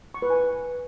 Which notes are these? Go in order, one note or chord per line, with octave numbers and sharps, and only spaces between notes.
C#6
B4
G#5